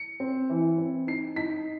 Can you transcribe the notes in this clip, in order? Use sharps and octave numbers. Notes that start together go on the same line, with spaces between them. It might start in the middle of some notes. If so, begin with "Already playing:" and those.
Already playing: C#7
C4
E3
C4
D#4 C7
D#4 B6